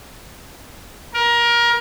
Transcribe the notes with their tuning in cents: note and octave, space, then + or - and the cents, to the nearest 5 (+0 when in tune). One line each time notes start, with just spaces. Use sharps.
A#4 +25